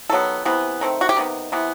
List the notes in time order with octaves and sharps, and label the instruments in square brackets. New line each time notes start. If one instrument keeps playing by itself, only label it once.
[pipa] D#3 F#3 B3 A4
C3 E3 B3
D#3 A3 C4
F#4
G4
C3 D#3 B3
C3 E3 B3